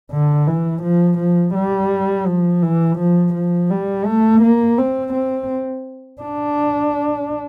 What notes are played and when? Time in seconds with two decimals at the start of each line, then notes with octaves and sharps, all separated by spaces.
0.11 D3
0.47 E3
0.83 F3
1.19 F3
1.54 G3
2.27 F3
2.62 E3
2.99 F3
3.34 F3
3.70 G3
4.05 A3
4.42 A#3
4.78 C4
5.14 C4
6.22 D4